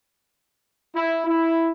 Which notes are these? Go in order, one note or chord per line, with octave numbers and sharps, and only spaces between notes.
E4
E4